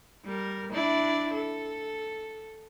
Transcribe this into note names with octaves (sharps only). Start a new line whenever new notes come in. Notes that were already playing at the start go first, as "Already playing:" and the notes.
G3 A#4
D4 E4 D5
A4